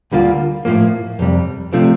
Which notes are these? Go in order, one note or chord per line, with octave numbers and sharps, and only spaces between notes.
D2 D3 G3 A#3 F4
A2 F3 A#3
F2 C3 G3
C3 F3 A3 D4